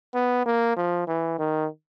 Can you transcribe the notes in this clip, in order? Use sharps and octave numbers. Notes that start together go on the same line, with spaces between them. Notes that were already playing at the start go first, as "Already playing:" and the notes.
B3
A#3
F3
E3
D#3